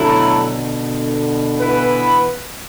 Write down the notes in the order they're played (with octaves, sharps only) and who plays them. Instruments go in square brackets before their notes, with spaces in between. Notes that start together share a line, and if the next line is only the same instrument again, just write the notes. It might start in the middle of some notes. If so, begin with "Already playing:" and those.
Already playing: [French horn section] B2 D3 [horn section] F#3 A3 E4 A4
[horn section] E3 B3 E4 B4